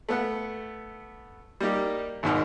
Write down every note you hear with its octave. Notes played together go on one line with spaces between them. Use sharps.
A3 B3 F#5
G3 A#3 D#4 G4
G#1 D#2 G#2 B2 D#4 A#4